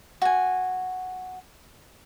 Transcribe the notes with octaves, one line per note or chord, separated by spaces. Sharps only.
F#4 G#5